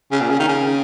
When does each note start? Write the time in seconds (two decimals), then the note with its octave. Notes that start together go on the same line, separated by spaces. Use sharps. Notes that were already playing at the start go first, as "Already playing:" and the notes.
0.12 C#3
0.21 A#2
0.30 C#3
0.39 D#3
0.48 C#3